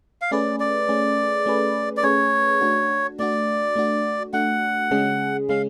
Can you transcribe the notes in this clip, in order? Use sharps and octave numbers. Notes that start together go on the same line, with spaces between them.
F5
A3 C#4 G#4 B4 D5
D5
A3 C#4 G#4 B4
A3 C#4 G#4 B4
D5
A3 C#4 G#4 B4 C#5
A3 D4 F#4
A3 D4 F#4 D5
A3 D4 F#4
A3 D4 F#4 F#5
C#3 G#3 C#4 G#4
C#3 G#3 C#4 G#4 F5